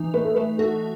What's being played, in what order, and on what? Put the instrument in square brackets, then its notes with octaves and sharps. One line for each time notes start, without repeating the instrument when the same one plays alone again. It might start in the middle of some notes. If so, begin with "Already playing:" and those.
Already playing: [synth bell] E3 D#4
[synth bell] A3 [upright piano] B4
[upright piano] A4
[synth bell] A3 [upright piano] B4
[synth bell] F#4 [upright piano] A4